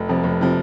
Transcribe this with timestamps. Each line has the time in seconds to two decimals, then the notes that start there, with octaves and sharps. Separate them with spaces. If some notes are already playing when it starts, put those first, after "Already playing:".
Already playing: F1
0.09 F2 C3 F3
0.24 F1
0.41 C3 F3